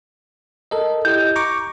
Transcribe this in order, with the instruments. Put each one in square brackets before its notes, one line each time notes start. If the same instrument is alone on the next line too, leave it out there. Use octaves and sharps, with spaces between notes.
[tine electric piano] A4 A#4 D#5
[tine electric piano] E4 G4 D#5 [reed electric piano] G6
[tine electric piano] A#5 C#6 D6